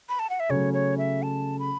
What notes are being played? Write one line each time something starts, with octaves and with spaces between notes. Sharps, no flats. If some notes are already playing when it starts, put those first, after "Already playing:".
B5
A5
F#5
E5
C#3 F#3 A3 C#5
C#5
E5
A5
B5